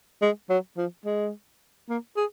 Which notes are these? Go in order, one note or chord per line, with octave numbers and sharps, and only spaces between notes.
G#3
F#3
F3
G#3
A#3
G#4